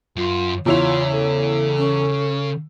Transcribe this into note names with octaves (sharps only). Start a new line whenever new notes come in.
F#2 F4
E2 C#3 E4 F4 C#5 F7
A4
C#4